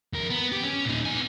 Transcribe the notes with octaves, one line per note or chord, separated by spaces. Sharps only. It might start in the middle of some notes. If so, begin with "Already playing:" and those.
F2 A#4
B3
G4
C#4
A#2 D#4
B3 G#5